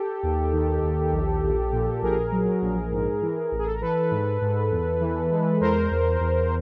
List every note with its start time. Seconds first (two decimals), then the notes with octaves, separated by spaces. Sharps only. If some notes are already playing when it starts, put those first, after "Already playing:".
Already playing: G4 A4
0.23 D#2
0.53 D#3
0.83 D#2
1.13 A#1
1.43 A#1
1.72 A#2
2.02 A#1 G#4 A#4
2.32 F#3
2.62 A#1
2.92 G#2
3.22 E3
3.52 A1
3.59 G#4
3.66 A4
3.74 A#4
3.82 E3 A4 B4
4.11 G#2
4.42 G#2
4.71 E2
5.01 E3
5.31 G#3
5.61 E2 A#4 C5
5.91 E2
6.21 E2